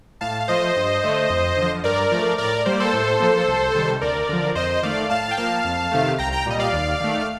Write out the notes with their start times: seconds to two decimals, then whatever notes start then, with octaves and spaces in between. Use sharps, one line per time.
0.21 A2 F5 A5
0.40 F5
0.48 F3 A3 C5 D#5
0.76 G2
1.03 D3 A3
1.30 F2
1.57 D3
1.62 F3
1.84 G2 A#4 D5
2.11 F3 A3
2.38 A2 A#4 D5
2.66 G3 A#3 C5
2.73 D5
2.80 A4 C5
2.93 A2
3.20 F3 A#3
3.48 C2
3.75 C3 D#3 G3
4.01 D2 A#4 D5
4.29 D3 F3
4.55 F2 C5 D#5
4.83 D#3 A3 D5 F5
5.10 A2 F5 A5
5.31 G5
5.37 F3 A#3 F5 A5
5.64 F2
5.91 C3 D#3 A3
6.18 C2 G5 A#5
6.32 G5 A#5
6.46 A#2 G3 D#5
6.59 D5 F5
6.73 D#2
7.00 D#3 A3
7.20 F5